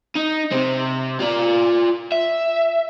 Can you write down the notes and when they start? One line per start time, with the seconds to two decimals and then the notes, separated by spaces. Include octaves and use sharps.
0.16 D#4
0.52 C3 C4
1.20 F4 D5
2.12 E5